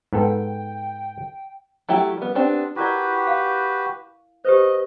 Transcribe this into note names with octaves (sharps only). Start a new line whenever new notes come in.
G#2 B3 A4 G5
F#3 A3 E4 G4
G3 B3
B3 C4 D4 G4
E4 F#4 G4 A#4 B4 D5
F5
G4 B4 C5 D#5